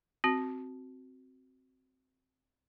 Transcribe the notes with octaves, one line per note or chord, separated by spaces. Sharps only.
C4 F#4